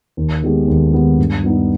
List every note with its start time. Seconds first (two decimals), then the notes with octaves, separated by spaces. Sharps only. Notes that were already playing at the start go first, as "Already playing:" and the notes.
0.17 D#2
0.42 D#3 G#3 B3 G4
0.68 D#2
0.93 D#3 G#3 B3 G4
1.18 G2
1.44 G3 B3 D#4